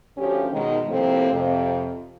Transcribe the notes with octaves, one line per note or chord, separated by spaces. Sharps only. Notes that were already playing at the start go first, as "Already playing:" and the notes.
D2 F3 C#4 G4
B2 D#3 G#3
A2 C3 F3 A3 A#3 C4
F2 C3